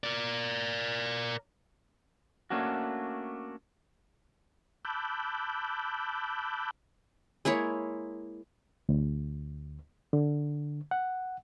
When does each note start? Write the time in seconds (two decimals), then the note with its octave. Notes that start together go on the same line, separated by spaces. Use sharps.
0.04 A#4 D5
2.50 A3 A#3 C#4 D4 F#4
4.85 A5 B5 D6 E6 F#6 G6
7.45 G#3 A#3 E4 C#5
8.89 D2
10.13 D3
10.91 F#5